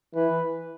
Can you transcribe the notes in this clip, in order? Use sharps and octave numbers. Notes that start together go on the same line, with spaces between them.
E3 B4